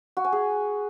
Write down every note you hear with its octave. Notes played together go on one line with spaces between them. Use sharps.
F#4
G#5
G#4